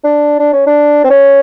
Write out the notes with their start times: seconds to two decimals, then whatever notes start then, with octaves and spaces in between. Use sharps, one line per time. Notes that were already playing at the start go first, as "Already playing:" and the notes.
0.04 D4
0.39 D4
0.53 C#4
0.66 D4
1.04 C4
1.10 C#4